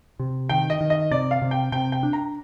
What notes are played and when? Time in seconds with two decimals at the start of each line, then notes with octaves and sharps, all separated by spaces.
0.19 C3
0.49 D#3 G5
0.70 D#5
0.81 D#3
0.90 D#5
1.11 C3 D5
1.31 F5
1.42 C3
1.51 G5
1.72 C3 G5
1.92 G5
2.03 D4
2.13 A#5